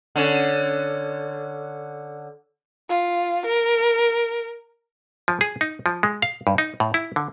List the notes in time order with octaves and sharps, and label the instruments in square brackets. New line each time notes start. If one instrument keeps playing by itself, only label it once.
[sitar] D3 C#4
[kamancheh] F4
A#4
[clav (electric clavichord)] F3
G#4
D#4
F3
G#3
F5
G2
D#4
A2
E4
D3